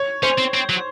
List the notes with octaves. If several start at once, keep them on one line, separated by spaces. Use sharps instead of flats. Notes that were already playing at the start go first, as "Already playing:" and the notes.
Already playing: C#5
C#4 C5
C4
C4
F#3